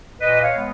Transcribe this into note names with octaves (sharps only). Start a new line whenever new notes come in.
A#2 B4 D#5
C#5 F5
G#3 B3